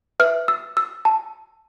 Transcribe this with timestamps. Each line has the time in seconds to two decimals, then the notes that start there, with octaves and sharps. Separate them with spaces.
0.20 B4 E5 F6
0.48 E6
0.77 E6
1.05 A5